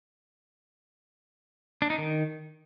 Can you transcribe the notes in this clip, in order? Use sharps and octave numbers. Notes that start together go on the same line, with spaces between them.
D4
D#4
D#3